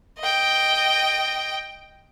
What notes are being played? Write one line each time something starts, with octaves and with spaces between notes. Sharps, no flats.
D#5 G5